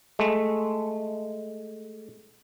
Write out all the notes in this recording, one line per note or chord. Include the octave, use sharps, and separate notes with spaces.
G#3 A3